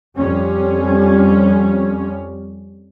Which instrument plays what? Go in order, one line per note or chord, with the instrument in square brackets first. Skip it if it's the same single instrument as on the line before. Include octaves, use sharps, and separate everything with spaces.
[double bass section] F2 G3 C#4